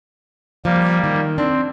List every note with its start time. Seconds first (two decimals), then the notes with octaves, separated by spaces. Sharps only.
0.65 F3 G3 A#3
1.04 D#3
1.38 C4 D4